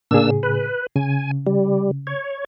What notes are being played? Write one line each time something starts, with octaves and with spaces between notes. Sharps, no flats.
A2 C#3 A#3 D4 G#4 E6
B4
C#3 G#5
G3
C#5